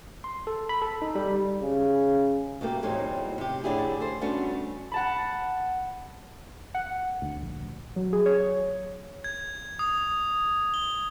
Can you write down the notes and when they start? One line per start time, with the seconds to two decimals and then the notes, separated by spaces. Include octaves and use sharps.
0.24 C6
0.47 A4
0.69 B5
0.82 A4
1.02 D#4
1.15 G3
1.62 C#3
2.61 B2 A3 A#3 G4
2.83 E2 A2 F#3 C4 D#4
3.38 C3 G4
3.64 A2 D3 D4 E4 G4 G#4
4.00 A4 C5
4.21 G3 A3 B3 C#4 D4 F#4
4.92 F#5 A5 B5
6.74 F#5
7.22 D2
7.42 A#1
7.96 F#3
8.13 G#4
8.26 C#5
9.24 G#6
9.79 D#6
10.74 G7